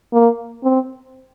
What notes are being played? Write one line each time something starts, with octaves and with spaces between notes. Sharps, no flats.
A#3
C4